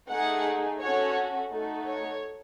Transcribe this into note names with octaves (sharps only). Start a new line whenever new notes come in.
A3 D#4 G#4 F#5
C#4 F#4 A4 C#5
A3 D#4 F#4 A4
C#5